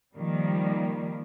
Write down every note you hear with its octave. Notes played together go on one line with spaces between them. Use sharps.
D#3 F3 G3 A#3